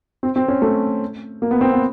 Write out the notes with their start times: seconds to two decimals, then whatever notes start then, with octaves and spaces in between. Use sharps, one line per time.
0.23 C4
0.36 C4
0.48 C#4
0.62 A3
1.42 A#3
1.51 B3
1.61 C4
1.72 B3